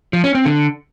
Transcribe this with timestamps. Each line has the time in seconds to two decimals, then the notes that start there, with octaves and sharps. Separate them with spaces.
0.13 F3
0.24 C#4
0.35 C4
0.45 D3